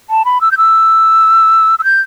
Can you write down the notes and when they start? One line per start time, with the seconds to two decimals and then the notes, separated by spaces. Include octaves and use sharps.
0.10 A5
0.25 B5
0.41 E6
0.51 G6
0.57 E6
1.79 E6
1.84 G6